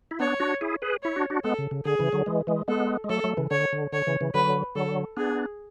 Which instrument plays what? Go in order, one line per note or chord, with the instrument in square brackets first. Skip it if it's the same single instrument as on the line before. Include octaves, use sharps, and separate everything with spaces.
[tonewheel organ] E4
[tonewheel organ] B3 D4 [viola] C#5
[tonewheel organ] D4 F#4
E4 G#4
G#4 B4
[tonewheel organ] E4 [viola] C#5
[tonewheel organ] D4 F#4
D4 F#4
[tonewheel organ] G#3 B3 [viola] A4
[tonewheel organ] C#3
C#3
[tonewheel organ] D3 [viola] G#4
[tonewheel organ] C#3 E3
D3 F#3
E3 G#3
E3 G#3
[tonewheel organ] G#3 B3 [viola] A4
[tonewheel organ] G#3
[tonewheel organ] F#3 A3 [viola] A4
[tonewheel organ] F#3 A3
C#3 E3
[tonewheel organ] D3 [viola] C#5
[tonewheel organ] D3
[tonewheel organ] D3 [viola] C#5
[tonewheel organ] C#3 E3
C#3 E3
[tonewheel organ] D3 F#3 [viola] B4
[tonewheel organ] D3 F#3 [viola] A4
[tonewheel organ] B3 D4 [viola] G#4